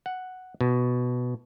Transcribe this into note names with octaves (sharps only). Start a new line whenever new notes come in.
F#5
B2